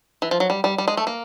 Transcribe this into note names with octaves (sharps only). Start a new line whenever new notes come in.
E3
F3
F#3
G3
G3
G3
G#3
A3
A#3